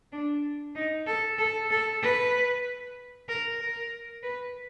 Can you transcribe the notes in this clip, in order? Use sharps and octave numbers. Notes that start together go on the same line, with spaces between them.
D4
D#4
A4
A4
A4
B4
A#4
A#4
B4